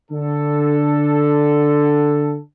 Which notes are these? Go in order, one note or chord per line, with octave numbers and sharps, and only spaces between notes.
D3 A4